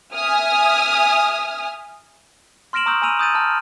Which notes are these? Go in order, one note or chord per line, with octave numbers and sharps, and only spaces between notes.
E5 G#5 D#6 F6
C6 F6 A#6 D7 E7 F#7
A#5 C#6 D#6 E6 G6 F#7
G#5 A#5 B5 E6 D#7 F7
D#6 G6 A6 D#7
A5 F6